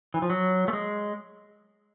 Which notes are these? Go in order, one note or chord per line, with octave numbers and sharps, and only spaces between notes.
E3
F3
F#3
A3
G#3